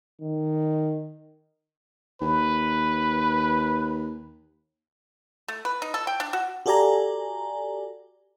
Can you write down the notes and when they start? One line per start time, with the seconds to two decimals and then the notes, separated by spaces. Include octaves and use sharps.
0.22 D#3
2.21 D#2 B4
5.48 A3
5.65 B4
5.82 D#4
5.94 A4
6.07 G5
6.20 D4
6.33 F#4
6.66 F#4 G4 A4 D5 G#5 A#5